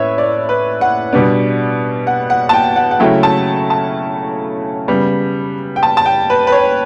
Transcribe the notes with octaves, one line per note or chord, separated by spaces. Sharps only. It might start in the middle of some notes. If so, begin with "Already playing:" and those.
Already playing: A2 C#4 B4 C#5 E5
D5
B4
F#5
B2 G3 B3 D4
F#5
F#5
A5
G5
F#5
F#5
C#3 F#3 A3 C#4 E4 G5
A5
A5
C#3 G3 B3
G5
A5
A5
G5
B4
B4
C#5